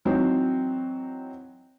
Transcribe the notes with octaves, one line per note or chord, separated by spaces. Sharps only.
E3 F#3 C4 D#4